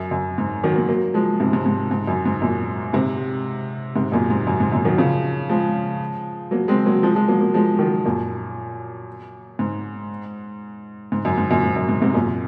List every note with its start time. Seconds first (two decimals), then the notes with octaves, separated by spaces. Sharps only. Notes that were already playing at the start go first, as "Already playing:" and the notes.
Already playing: F#2
0.11 F#2
0.38 G#2
0.63 D#3 F#3
0.75 F#3 A#3
0.89 F#3 A#3
1.14 F3 G#3
1.40 G#2 C3
1.53 G#2
1.66 G#2
1.91 G#2
2.07 F#2
2.25 G#2
2.42 F#2 A#2
2.93 G#2 C3
3.96 G#2 C3
4.12 F#2 A#2
4.30 G#2
4.47 F#2
4.60 G#2
4.72 F#2 A#2
4.85 D#3 F#3
4.97 C#3 F3
5.49 F3 G#3
6.51 F#3 A#3
6.68 G#3 C4
6.86 F#3 A#3
7.03 F3 G#3
7.15 F3 G#3
7.28 F#3 A#3
7.40 F#3 A#3
7.54 F3 G#3
7.79 D#3 F#3
8.05 F#2 A#2
9.59 G#2
11.12 G#2
11.25 F#2
11.38 G#2
11.50 F#2 A#2
11.63 G#2
11.76 F#2
11.89 G#2
12.02 G#2 C3
12.14 F#2 A#2